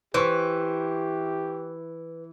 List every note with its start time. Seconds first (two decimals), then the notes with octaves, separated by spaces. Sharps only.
0.14 E3 G4 B4 C5 C#6